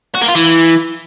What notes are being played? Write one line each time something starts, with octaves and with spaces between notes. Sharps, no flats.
F#4
A#3
F4
E3